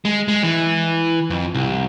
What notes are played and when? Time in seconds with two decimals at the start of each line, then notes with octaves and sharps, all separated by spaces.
0.05 G#3
0.28 G#3
0.43 E3
1.30 F2
1.54 C2